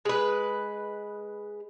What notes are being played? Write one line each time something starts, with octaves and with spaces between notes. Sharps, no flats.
G#3 B4